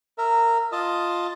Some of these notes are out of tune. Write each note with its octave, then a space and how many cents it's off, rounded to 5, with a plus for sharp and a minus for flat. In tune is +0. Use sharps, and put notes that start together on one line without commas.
A#4 -15 E5 +0
F4 +0 D#5 +0 A5 +0